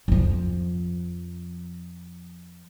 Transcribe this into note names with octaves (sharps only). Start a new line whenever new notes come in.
F2 F3